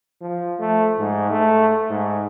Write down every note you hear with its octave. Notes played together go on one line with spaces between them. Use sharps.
F3
A3
G#2
A3
G#2